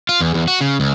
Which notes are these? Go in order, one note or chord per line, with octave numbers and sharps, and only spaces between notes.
F4
E2
E2
F#4
C#3
C#2